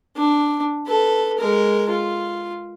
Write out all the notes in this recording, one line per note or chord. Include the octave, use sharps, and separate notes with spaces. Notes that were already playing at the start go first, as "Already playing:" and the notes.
D4
A4 B4
G#3 A#4
F4